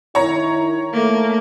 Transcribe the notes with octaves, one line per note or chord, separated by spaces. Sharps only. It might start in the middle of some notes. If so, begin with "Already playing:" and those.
D#3 E4 C#5 A#5
A3 A#3